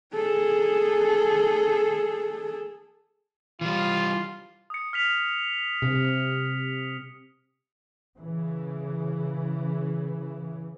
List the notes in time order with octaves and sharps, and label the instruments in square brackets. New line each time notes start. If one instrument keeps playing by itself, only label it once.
[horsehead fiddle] G#4 A4
[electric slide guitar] E3 G3 [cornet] F4
[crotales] D#6 C#7
F6 B6 F7
[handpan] C3
[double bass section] C#3 E3